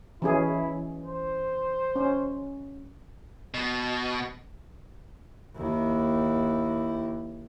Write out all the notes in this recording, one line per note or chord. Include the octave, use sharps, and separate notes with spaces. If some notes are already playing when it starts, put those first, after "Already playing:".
E3 C#4 E4 G#4
C5
C#4
B2
D#2 E4